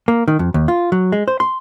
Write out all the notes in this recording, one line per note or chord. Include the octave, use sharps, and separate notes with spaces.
A#3
D#3
F2
D#2
F4
F#3
G#3
C5
C6